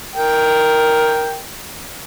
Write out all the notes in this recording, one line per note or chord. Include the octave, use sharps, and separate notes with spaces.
A#4 G5